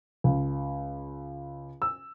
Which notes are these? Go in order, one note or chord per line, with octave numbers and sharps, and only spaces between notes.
C#2
E6